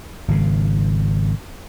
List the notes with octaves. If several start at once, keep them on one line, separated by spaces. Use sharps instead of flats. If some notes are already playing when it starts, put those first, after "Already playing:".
G#1 C#3